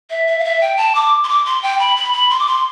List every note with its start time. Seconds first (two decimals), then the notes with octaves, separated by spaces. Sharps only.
0.10 E5
0.27 E5
0.39 F5
0.44 E5
0.61 G5
0.77 A5
0.95 D6
1.24 C6
1.29 D6
1.46 C6
1.63 G5
1.79 B5
1.97 B5
2.13 B5
2.30 C6
2.40 D6
2.47 C6